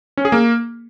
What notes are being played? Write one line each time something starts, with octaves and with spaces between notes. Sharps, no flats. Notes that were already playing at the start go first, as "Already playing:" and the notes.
C#4
G#4
A#3